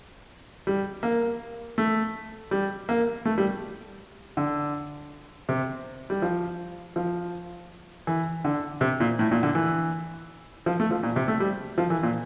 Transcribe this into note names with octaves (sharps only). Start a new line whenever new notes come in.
G3
A#3
A3
G3
A#3
A3
G3
D3
C3
G3
F3
F3
E3
D3
C3
A#2
A2
A#2
D3
E3
F3
A3
F3
A#2
C3
A3
G3
F3
E3
A#2